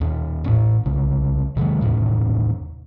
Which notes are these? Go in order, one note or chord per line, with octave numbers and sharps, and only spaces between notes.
D#2 C#4
A2 C#4
C2 C#3
C3 D#3 F#3 G#3
D#2 A2 C3